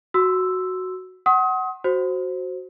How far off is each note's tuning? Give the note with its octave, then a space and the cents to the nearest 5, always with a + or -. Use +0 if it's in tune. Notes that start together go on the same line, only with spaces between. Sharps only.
F#4 +0 C6 +0 E6 +0
F#5 +15 C6 +40 D#6 +30
F#4 +0 C5 +5